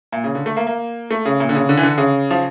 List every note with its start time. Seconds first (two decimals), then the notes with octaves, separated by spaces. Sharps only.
0.12 A#2
0.24 C#3
0.35 D3
0.46 A3
0.57 A#3
0.67 A#3
1.11 A3
1.25 C#3
1.40 A#2
1.49 D3
1.55 C#3
1.69 D3
1.77 E3
1.83 D3
1.98 C#3
2.31 F3